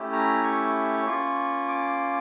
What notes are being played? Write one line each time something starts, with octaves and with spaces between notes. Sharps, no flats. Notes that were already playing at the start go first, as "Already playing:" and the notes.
Already playing: A3 C#4 E4 G4
A#5
C#6
A#3 C#4 F4
D6